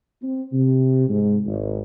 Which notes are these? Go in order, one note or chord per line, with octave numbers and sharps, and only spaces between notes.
C4
C3
G#2
G#1